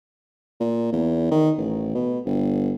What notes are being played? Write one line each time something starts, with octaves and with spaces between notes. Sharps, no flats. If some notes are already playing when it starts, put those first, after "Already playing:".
A#2
E2
D#3
A1
B2
G1